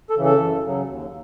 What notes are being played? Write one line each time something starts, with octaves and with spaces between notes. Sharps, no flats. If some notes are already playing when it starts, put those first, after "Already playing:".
A4
C#3 E3
A4
F#2
C#3 F#3
D#2